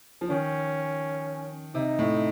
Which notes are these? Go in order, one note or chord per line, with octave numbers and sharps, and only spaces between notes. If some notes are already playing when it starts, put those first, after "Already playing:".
F3
D#3 C#4
C3 D#4
A2